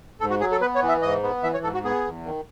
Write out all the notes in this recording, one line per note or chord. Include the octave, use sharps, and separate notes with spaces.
G#2 A4
F#4
F#3 G#4
A4
B3 B4
C#5
E3
E5
G#2 D#5
B3
E3 E5
C#5
G#2 A4
F#4
B3 G#4
E2
D#3